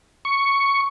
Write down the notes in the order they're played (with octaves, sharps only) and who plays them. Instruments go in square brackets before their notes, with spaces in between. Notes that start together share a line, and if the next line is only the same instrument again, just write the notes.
[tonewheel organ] C#6